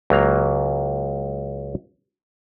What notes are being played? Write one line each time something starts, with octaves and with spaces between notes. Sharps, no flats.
C#2 F#3 A#3 A#5